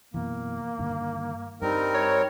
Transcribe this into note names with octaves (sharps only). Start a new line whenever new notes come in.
F#2 B2 E3 A#3
G2 D3 D#3
G2 G3 C4 D#4 A#4
C#5